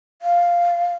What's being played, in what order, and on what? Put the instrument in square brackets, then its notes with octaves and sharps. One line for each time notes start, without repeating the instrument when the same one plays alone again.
[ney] F5